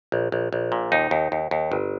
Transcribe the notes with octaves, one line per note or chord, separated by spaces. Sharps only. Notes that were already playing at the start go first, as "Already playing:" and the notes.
A#1
A#1
A#1
A#2
D#2 D#4
D#2
D#2
D#2
G1